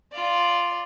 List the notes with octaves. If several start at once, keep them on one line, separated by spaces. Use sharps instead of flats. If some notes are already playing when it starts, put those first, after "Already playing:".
F4 D5